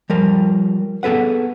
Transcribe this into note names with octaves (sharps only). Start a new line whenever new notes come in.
F3 G3 A#4
B3 G#4 A4 B4 F#5